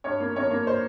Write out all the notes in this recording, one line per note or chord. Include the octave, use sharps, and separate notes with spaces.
G2 C#5
A#3
A#3 C#5
A#3
C5